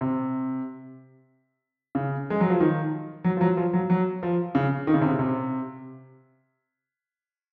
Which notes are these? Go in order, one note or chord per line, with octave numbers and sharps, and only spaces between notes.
C3
C#3
G#3
F#3
F3
D#3
F#3
F3
F#3
F3
F#3
F#3
F3
C#3
D#3
C#3
C3
C#3
C3